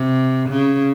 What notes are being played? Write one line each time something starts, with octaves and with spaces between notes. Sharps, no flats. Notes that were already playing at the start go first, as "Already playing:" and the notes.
Already playing: C3
C#3